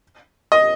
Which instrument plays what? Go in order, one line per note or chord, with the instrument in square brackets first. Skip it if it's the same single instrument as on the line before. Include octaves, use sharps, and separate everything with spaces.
[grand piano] D#5